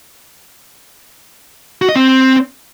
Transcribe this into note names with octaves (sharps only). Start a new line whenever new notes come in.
F#4
D#5
C4